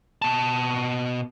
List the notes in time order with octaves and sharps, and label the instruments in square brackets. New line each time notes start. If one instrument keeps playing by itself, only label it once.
[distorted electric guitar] B2 A5